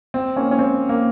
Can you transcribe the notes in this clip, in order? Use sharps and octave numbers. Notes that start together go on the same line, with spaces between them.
C4
A#3 C#4
C#4
C4
A#3